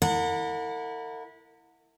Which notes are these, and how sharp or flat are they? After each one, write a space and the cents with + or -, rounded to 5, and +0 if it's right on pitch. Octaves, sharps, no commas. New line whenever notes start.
E4 -20 A#4 -45 F#5 -30